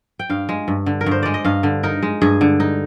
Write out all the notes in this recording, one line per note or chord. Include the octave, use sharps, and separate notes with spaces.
G5
G2 F5
G#3
G2
D3
A#4
G2
C5
G#3 D5
D#5
G2 F5
D3
D#4 A#4
G#3
G2 G#4
D3
D#4